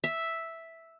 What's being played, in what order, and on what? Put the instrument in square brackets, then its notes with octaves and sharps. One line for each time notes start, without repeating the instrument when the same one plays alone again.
[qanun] E5